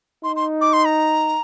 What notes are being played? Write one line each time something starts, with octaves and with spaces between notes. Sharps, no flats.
D#4 C6
C6
D6
C6
A#5